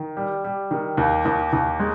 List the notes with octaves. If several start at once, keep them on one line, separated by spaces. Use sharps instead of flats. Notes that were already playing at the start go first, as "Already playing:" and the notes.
Already playing: D#3
G3
G3
D#3
D#2
D#2
D#2
G#3